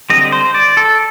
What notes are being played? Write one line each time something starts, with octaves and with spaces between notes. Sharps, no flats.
D3 G3 C4 D#5
C5
D5
A4